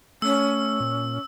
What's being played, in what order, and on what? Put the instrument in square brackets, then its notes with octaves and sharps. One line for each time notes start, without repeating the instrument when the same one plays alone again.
[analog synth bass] A3 [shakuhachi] C#4 [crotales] E6
[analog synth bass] A#2